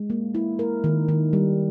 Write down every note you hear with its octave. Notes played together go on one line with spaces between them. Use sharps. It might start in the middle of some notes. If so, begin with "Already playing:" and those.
Already playing: G#3
A#3
E4
A#4
D#3
D#3
G3